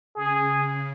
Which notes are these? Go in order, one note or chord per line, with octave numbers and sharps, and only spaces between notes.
C#3 G#4